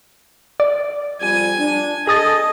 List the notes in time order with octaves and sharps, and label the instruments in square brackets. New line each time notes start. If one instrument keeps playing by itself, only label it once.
[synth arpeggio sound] D5
[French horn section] F2 G3 [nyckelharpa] G#5
[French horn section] D4
[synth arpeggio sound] G#4 D#6 A6 [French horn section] A4 [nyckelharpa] D#5